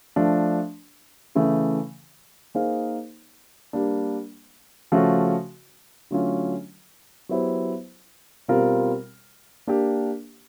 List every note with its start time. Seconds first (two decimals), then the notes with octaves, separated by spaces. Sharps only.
0.16 F3 A3 D4
1.35 C#3 E3 A3
2.55 A#3 D#4 G#4 C5 F5
3.73 G3 A#3 D4
4.92 C#3 F3 A3 C#4 F#4
6.11 D3 F#3 A3 C#4 F4
7.29 F#3 B3 E4 G4 C5
8.48 B2 G3 C4 F4 A#4
9.67 A#3 D4 G4